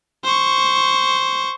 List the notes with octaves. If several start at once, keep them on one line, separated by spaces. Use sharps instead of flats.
C5 C#6